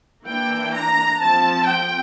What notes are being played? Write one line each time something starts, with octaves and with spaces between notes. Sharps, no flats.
E3 A#3 D4 G5
A#5
F3 C4 A5
G5